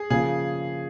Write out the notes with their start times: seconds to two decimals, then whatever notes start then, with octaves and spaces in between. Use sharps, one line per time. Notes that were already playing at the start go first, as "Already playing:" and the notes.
Already playing: G#4
0.10 C#3 F3 A#3 G#4